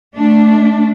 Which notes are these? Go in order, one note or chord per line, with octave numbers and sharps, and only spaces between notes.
A3 D4